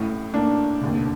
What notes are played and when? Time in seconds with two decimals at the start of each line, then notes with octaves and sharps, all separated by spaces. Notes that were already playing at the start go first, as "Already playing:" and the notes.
Already playing: A1 A2
0.34 A#3 D4
0.81 F1 D#2 D3